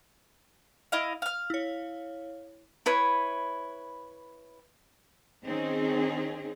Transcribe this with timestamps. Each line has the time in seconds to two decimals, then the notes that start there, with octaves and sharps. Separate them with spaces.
0.92 E4 D#5 F5
1.22 F5 F6
1.50 E4 C#5
2.86 E4 B4 C#5
5.45 D#3 C4 C#4 D#4 G#4